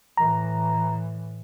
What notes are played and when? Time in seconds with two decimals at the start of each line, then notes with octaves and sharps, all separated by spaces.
0.17 A2 E3 A#5